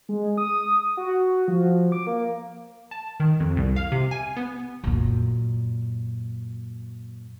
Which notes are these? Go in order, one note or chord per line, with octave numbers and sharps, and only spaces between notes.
G#3
D#6
F#4
F3
D6
A#3
A5
D#3
F2
C2
F5
C3
G#5
B3
F#2 A#2